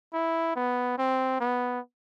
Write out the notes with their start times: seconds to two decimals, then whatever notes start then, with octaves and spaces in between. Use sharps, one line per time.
0.13 E4
0.56 B3
0.98 C4
1.40 B3